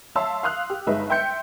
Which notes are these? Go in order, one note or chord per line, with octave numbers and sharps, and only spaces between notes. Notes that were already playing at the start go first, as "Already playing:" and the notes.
C#5 E5 F5 A5 C6 E6
F5 C6 D#6 F6 F#6
G4
G1 G#3 D#4 B4 E5
E5 G5 C6 G6 C#7